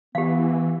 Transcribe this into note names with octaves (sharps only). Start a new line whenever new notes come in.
E3 B3 G4 F5